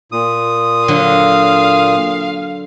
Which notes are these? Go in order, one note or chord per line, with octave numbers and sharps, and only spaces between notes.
A#2 D#6
D3 F#3 F5